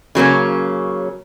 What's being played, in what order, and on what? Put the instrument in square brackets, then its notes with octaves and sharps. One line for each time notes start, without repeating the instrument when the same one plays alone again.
[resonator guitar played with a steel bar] C#3 F#3 A#3 C#4